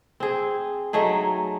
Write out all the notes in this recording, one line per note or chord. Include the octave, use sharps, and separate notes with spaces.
C4 G#4
F#3 A3 D#4 G#4